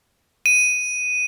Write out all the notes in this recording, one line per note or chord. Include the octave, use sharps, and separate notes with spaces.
D#7